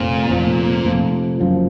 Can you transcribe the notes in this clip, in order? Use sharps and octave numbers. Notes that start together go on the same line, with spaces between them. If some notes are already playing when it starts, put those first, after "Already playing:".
Already playing: F1 F2 A#2 F3
F1 F2 F3
F1 F2 F3
F#1 F#2 F3